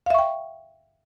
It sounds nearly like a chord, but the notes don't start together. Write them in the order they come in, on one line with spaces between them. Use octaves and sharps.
F5 E5 C#6 G5